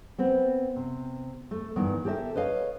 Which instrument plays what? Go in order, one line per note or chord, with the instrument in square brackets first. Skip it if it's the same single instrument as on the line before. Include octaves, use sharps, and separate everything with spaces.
[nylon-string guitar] B3 C4
C3
A3
G2 D#3 E3 B3
G4 A4 A#4 D#5 E5
B4 C#5 D#5 F5